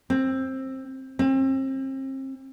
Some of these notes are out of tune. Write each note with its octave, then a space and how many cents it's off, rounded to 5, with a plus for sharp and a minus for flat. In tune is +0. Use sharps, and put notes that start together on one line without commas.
C4 +15
C4 +35